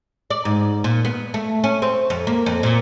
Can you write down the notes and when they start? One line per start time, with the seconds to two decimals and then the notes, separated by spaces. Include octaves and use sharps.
0.30 D5
0.45 G#2
0.84 A#2
1.05 B3
1.34 A3
1.64 C#4
1.82 C4
2.10 F2
2.27 A#3
2.46 F2
2.63 A#2